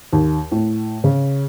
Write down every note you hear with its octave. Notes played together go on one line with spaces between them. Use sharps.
D#2
A2
C#3